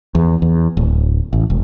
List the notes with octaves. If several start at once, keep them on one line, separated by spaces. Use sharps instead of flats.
E2
E2
D1
A1
E1